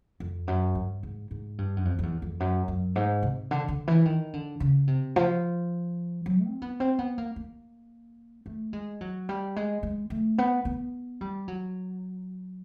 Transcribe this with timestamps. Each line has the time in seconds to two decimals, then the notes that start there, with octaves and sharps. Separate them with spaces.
0.20 F2
0.47 F#2
0.75 G2
1.03 G#2
1.31 G#2
1.58 G2
1.77 F#2
1.85 F2
1.99 F2
2.03 E2
2.22 F2
2.40 F#2
2.68 F#2
2.96 G#2
3.23 C3
3.51 D3
3.68 D3
3.88 E3
4.05 D#3
4.33 D3
4.60 C#3
4.87 C3
5.16 F3
6.26 F#3
6.44 C4
6.62 B3
6.80 C4
6.99 B3
7.18 A#3
7.36 A#3
8.46 A3
8.73 G#3
9.01 F#3
9.29 G3
9.56 G#3
9.83 G#3
10.10 A3
10.38 B3
10.65 B3
11.21 G3
11.48 F#3